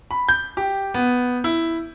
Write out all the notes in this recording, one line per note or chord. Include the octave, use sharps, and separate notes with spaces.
B5
G6
G4
B3
E4